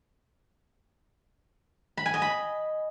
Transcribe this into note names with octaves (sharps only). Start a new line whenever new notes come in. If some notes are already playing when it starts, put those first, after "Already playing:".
B5
G#5
D#5
B5